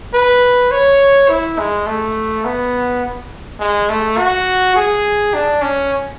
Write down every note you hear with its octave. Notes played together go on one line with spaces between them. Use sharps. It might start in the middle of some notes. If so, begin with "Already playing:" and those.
B4
C#5
E4
G#3
A3
B3
G#3
A3
F#4
G#4
D4
C#4